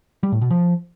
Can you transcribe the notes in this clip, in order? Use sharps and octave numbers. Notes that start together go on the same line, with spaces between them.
G3
A2
B2
F3